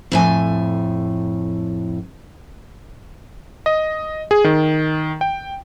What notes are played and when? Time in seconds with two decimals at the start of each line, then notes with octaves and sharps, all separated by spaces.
0.12 F2 A2 G#5
3.66 D#5
4.31 G#4
4.44 D#3
5.21 G5